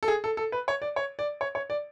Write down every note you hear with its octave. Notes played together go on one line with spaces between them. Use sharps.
A4
G#4
A4
A4
B4
C#5
D5
C#5
D5
C#5
C#5
D5